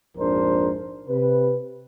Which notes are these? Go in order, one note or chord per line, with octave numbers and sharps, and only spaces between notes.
A#1 F2 G#2 D4 A#4 C5
C3 B4